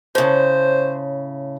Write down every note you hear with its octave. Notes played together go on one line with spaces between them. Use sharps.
A2 C#3 C5